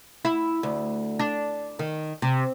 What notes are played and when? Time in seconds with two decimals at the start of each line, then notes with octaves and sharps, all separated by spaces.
0.25 E4
0.63 D2
1.19 D4
1.79 D#3
2.22 C3